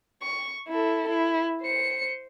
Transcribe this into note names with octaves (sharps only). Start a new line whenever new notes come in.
C#6
E4 A4
E4
C5 C#7